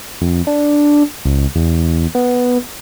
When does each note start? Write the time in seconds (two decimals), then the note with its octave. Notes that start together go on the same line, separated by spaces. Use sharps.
0.21 F2
0.47 D4
1.25 C#2
1.55 E2
2.15 B3